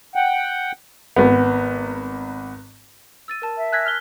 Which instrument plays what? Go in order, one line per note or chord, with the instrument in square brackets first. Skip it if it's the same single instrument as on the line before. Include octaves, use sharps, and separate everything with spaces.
[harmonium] F#5 G5
[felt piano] G#1 B3
[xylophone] E6 A6 D#7
A#4 A5
[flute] E5
[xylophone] G#5 E6 A#6 [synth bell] F#6 G#6 B6
[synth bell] F6 G7